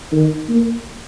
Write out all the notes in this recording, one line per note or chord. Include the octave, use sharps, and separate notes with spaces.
D#3
A#3